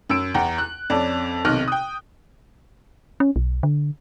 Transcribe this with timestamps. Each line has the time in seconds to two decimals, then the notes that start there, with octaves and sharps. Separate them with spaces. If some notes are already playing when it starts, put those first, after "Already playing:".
0.10 F#2 E6 D7
0.34 E2 F#5 G5 A#5
0.58 F#6
0.90 F2 C#4 D5 A5
1.45 B1 C3 D#3 D#5 F6 F#6
1.68 G5 D#6
3.20 C#4
3.36 B1
3.63 D3